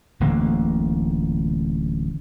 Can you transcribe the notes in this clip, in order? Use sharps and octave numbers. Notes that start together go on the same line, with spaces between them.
D1 A1 D3 A#3